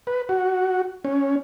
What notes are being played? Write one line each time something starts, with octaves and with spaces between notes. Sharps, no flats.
B4
F#4
C#4